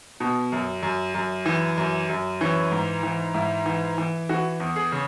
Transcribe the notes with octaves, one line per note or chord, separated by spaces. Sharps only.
B2
F#2
F#2
F#2
E3
F#2
F#2
E3 C#4
G#2
E3
G#2 E4
E3
E3
E3 F#4
E2
G#4
C#3